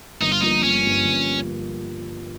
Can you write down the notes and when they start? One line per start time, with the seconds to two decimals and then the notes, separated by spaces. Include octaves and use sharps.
0.21 G1 D#4
0.32 F4
0.41 G2 F3 A#3 D#4
0.63 G1 C#4
0.85 G2 F3 A#3
1.05 G1